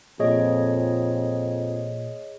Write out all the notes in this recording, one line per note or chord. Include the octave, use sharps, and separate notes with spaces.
F2 A#2 G#4 C#5 D#5